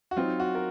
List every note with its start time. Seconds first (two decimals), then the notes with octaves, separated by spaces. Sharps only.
0.11 F#4
0.16 F#3 C4 D#4 F4
0.40 F#4
0.55 A#4